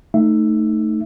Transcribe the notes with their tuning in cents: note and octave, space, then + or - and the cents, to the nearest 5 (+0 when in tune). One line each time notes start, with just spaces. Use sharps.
A3 +5 D#4 +0 E5 +10